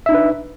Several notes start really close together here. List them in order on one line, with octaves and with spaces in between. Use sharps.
E5 D#4 D4 B4